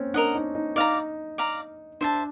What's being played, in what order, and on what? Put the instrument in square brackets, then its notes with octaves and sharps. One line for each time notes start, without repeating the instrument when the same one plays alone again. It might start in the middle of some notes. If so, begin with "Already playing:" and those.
Already playing: [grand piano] A#3 C4 C#4
[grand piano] D4 [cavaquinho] A#4 D#5 F#5
[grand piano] D#4
D#4
[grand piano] D#4 [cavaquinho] D5 F5 A#5
[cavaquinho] D5 F5 A#5
[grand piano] D4 [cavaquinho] C5 E5 A5